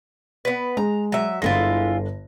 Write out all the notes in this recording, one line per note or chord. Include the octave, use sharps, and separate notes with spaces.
B3 B4
G#3 A#5
F#3 E5
G1 D3 G#3 E4 F4 A#6